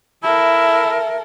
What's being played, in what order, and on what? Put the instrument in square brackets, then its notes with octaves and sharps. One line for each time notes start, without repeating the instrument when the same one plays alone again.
[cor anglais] E4 [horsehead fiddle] A4 A#4 [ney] E5